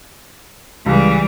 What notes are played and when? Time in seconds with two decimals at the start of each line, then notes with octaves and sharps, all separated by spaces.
0.86 C#2 E3 G3